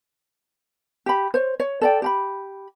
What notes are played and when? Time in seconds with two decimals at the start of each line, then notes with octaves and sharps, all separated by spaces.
1.06 G4 B5
1.34 C5 C#5
1.60 C#5
1.81 A4 D5 G5
2.02 G4 A#5 B5